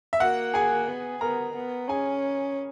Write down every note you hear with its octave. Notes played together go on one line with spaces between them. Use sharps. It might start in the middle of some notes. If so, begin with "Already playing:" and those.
E5
A#3 F#4 F#5
G#4 G#5
B3
B3 A#4 A#5
B3
C#4 G#4 G#5